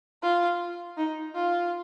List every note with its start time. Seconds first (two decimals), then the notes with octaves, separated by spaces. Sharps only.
0.22 F4
0.97 D#4
1.34 F4